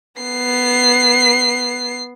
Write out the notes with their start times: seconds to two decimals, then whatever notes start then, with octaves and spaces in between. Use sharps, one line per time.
0.22 B3 C7